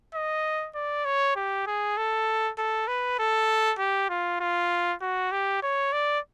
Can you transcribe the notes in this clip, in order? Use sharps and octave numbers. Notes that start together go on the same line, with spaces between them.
D#5
D5
C#5
G4
G#4
A4
A4
B4
A4
G4
F4
F4
F#4
G4
C#5
D5